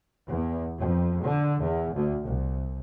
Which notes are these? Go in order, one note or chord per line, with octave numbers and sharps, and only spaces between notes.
E2
F2
D3
E2
D2
C2